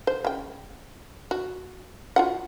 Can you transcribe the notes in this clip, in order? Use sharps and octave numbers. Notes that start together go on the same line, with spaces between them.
C5
C#3 G5
F#4
F4 F#4 F#5